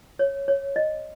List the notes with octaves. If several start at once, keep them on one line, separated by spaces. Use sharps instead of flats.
C#5
C#5
D#5